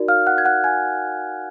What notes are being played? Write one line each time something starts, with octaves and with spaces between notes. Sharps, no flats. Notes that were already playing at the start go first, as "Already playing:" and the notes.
Already playing: D#4 F#4 A#4 D5
F5 F6
F#5 F#6
G#6
F#5 F#6
G#5 G#6